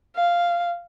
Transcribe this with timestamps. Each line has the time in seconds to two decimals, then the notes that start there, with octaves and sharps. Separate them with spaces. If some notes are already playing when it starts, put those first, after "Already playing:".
0.16 F5